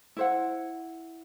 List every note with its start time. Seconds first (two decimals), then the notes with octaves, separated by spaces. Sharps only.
0.17 E4 C5 F#5